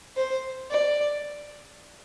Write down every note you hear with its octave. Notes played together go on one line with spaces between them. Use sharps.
C5
D5